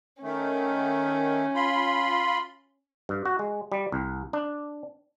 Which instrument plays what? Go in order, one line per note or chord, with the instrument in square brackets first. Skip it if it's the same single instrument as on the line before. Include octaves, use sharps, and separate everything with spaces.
[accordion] D#3 A3 [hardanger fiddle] C#4
[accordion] F4 B5 C6
[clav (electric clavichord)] G2
F#4
G#3
G3
C2
D4